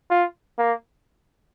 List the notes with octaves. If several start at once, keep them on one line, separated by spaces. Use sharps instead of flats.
F4
A#3